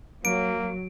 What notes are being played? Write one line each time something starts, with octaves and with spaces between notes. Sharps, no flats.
F#3 A#3 D7